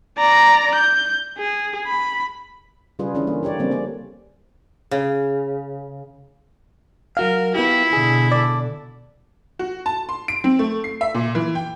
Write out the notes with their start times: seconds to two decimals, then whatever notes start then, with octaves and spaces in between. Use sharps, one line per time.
0.18 D5 A#5
0.75 G6
1.38 G#4
1.87 B5
2.99 C#3 G3 F4 G#4 B4
3.15 D3 E3 C#4 E4
3.27 A#3
3.43 D3 G4 C#5 D5
3.59 C#3 G3 A#3 C4
3.71 A#3 C#4 D5
4.91 C#3
7.17 F#3 F#4 A#4 F5
7.55 B3 E4 F4 G4
7.93 B2 D3 G#4
8.32 A4 D5
9.59 F#4
9.86 A5
10.09 C6
10.28 D7
10.44 C4
10.59 A3
10.84 C7
11.01 E5
11.14 A#2
11.35 E3
11.55 G5